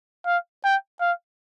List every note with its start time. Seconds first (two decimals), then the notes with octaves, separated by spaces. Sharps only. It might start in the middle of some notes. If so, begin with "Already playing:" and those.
0.26 F5
0.65 G5
1.01 F5